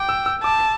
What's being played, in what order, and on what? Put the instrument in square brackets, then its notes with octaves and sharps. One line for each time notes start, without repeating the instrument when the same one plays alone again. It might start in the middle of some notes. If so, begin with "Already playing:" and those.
Already playing: [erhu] G5 [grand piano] D6
[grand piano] E6
E6
[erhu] A5 [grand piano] D6